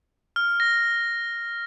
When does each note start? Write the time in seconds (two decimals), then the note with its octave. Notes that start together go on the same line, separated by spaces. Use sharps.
0.36 F6
0.60 A#6